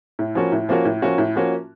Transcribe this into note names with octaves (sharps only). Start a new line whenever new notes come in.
A2
F3 A#3 C#4 F#4
A2
F3 A#3 C#4 F#4
A2
F3 A#3 C#4 F#4
A2
F3 A#3 C#4 F#4